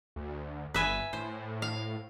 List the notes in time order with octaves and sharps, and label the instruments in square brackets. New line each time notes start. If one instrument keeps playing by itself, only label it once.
[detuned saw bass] D2
[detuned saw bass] G1 [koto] B4 E5 G#5
[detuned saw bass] A2 [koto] C5
[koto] F5